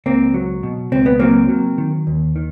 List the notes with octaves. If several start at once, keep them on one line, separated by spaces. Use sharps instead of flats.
C#2 A#3 C4
F#3
B2
C#2 C4
B3
F#3 A#3 C4
F#3
D#3
D#2
D#3